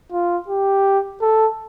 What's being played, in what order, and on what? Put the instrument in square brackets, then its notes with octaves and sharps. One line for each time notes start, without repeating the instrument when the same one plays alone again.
[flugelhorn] F4
G4
A4